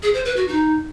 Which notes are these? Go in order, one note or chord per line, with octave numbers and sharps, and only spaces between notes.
G#4
C5
B4
F#4
D#4